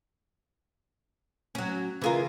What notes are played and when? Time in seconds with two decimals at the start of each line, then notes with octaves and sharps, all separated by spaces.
1.55 F#3 C#4
2.02 C#3 E3 F4 G#4 A#4